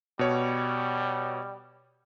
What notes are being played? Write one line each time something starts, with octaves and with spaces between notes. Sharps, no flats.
B2 G3 C#5